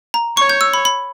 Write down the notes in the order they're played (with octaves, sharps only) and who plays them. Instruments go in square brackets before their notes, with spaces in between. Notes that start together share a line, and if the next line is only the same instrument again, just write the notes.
[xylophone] A#5
[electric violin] C#5 [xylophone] C#6
[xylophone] G6
E6
B5
B5